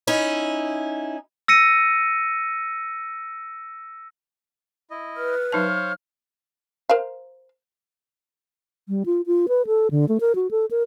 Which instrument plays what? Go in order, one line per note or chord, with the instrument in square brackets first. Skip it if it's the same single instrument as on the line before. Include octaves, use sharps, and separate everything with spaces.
[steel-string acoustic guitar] C#4 D#4 E4
[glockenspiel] E6 A#6 C#7 D#7
[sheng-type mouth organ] E4 D#5
[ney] B4 [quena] F6
[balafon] F#3 D#4 A5 [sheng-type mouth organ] C5 C#5 F5 [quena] F6
[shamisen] A#4 C5 F5
[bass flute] G3
F4
F4
B4
A4
D3
A3
A#4
F#4
A4
A#4